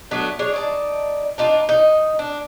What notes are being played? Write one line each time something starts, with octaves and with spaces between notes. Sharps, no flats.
F#3 A3 B3 D4
D4 G#4 C#5
D#4 D5 A5
D4 D#4 F4
D#4
D4